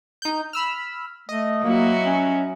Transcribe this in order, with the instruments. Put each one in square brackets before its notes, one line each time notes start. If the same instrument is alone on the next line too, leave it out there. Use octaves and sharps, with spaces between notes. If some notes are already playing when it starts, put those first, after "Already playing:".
[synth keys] D#4 G6
B5 E6 F6
[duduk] A3 [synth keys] D#5
[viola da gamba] F#3 E4 F#4 [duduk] A#3
[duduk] C#4